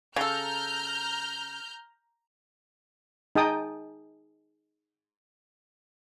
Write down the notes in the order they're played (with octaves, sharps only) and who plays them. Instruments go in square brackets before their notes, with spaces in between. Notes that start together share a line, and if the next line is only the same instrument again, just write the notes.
[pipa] C#3 A4 [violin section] A#5 F6 G6
[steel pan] D#4 G#4 G5 A5 D#6